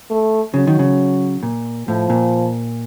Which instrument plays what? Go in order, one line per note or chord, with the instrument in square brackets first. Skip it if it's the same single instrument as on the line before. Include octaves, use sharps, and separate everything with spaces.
[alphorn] A3
[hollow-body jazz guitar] C#3 [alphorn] F#3
[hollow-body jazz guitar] D#3
C#3
A#2
[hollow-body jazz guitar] A2 [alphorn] F3
[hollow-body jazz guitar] A#2